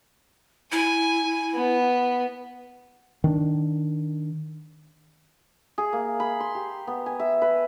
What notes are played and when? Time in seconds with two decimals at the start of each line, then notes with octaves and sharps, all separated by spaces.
0.72 E4 G#5
1.55 B3
3.24 D#3 D4
5.78 G#4
5.93 A#3
6.20 B5
6.40 C6
6.55 G4
6.87 B3
7.06 G#5
7.19 E5
7.42 B4